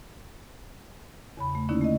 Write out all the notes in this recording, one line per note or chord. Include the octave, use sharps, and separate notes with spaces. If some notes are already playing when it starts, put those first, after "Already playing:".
E2 C#3 B5
A3
D3 A#3 C#4 D#4 E4
A3 D#5